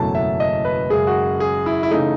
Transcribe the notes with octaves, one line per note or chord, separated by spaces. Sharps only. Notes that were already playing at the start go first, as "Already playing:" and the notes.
Already playing: F#1 E2 B2 F#3 A3 A5
E5
D#5
B4
F#2 C#3 G#3 G#4
F#4
G#4
E4
E4
C#3 E3 A3 D#4